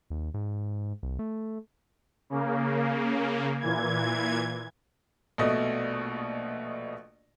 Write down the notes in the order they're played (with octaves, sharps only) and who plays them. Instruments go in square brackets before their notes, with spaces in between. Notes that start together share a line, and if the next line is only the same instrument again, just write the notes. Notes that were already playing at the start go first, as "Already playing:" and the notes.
[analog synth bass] D#2
G#2
C2
A3
[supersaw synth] C#3 A#3
A#2 E3 G#6
[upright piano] A#1 B2 A3 D#5